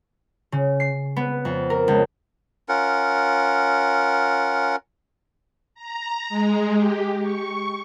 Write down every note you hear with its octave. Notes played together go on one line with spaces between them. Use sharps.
C#3
C7
B3
F2
A#4
C#2
C#4 F4 A#4 F#5
A#5
G#3
G4
C#6